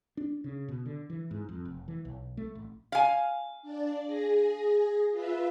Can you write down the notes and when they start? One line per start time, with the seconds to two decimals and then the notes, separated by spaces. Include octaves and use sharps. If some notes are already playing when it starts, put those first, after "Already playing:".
0.17 D4
0.44 C#3
0.68 B2
0.86 D3
1.10 E3
1.31 G#2
1.49 F2
1.65 F1
1.88 E3
2.05 B1
2.37 A3
2.55 A1
2.92 F5 G#5
3.62 D4 D5
4.06 G#4 A#6
5.11 F4 B4 E5